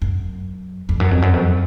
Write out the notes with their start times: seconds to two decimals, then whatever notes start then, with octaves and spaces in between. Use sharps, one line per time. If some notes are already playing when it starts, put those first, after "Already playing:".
0.02 F#2
0.89 F2
1.00 F#2
1.11 F2
1.22 F#2
1.33 F2